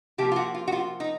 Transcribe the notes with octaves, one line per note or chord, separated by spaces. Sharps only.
C3 F3 A#3 G4
F4
F#4
F4
F#4
F4
D#4